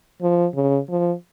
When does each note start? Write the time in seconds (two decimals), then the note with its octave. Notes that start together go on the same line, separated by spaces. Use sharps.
0.22 F3
0.55 C#3
0.89 F3